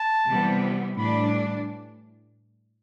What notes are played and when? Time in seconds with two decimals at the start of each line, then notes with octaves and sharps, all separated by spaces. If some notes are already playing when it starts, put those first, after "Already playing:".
Already playing: A5
0.27 C3 E3 G3 B3
0.98 A2 E3 G3 D4 B5